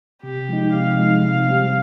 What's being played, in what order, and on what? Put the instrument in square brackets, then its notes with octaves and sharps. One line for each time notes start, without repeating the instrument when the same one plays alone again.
[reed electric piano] C3 [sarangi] G4
[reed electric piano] F3 G#3 D#4
[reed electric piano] C3 [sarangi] F5
[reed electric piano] F3 G#3 D#4
C3
G3 C4 G4